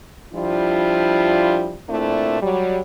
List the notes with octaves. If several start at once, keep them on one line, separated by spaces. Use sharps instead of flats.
F3 G3 D4 E4 F4
A#2 A3 C4 D4 E4
F#3 G3